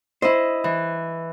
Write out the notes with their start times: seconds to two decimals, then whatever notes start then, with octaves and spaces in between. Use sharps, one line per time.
0.22 E4 C5 D#5
0.64 E3